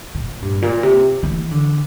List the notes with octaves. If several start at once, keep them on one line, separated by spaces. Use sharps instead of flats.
A#2
G2
A#2
C3
E3
D3